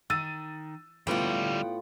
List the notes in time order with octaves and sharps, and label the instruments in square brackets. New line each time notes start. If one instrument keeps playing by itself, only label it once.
[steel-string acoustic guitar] D#3 [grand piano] E6 A6 D#7
[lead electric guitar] D2 G3 [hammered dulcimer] A2 F4 D6 [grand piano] B3 [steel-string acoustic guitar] F#5 G5